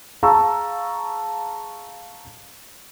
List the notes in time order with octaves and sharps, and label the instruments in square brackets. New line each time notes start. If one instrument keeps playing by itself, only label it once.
[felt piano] G#4 F5 A5 A#5 C#6 E6